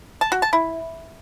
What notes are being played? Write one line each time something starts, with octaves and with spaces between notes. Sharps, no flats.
A5
F#4
A5
E4